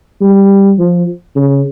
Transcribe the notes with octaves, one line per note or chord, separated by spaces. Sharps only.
G3
F3
C#3